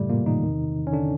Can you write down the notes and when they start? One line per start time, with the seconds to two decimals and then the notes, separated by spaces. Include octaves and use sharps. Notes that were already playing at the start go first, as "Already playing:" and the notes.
Already playing: F#2 A2 C#3 E3 G3 A3
0.09 A#2 A#3
0.26 D#3 D#4
0.44 E2 C3 D#3
0.87 C#4
0.92 D3 D4